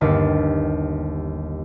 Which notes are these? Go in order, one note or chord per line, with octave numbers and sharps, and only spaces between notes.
G1 D#2 F5 A6